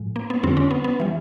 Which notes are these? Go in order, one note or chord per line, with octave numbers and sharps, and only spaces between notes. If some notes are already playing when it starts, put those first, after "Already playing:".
Already playing: A2 F3 G#3
A#3
B3
F2 D3 G3 C4
C#4
B3
B3
E3 G3